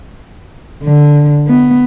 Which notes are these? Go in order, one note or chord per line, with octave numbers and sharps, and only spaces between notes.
D3
B3